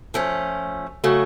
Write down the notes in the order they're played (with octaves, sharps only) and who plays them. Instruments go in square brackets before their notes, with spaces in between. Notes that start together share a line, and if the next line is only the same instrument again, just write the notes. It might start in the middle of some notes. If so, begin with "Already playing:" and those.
[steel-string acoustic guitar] F3 A3 C#4
C#3 F#3 A3